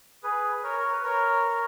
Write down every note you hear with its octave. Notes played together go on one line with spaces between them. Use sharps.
G#4 B4
A#4 C#5
A#4
B4
A#4 C#5